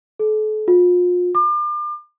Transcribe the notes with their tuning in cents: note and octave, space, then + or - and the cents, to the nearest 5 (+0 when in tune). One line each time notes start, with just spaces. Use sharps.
A4 -40
F4 +35
D6 +35